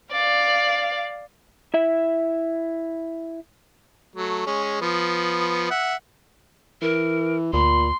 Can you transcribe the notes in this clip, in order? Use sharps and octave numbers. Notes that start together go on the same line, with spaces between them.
D5 F5
E4 E5
F#3 A3
G#3 C#4
F3 B3
E5 F#5
E3 A#4
D2 A#2 B5 C6